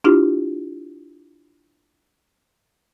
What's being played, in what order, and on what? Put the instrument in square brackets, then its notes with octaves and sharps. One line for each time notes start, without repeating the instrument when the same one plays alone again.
[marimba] D4 E4 F4 G4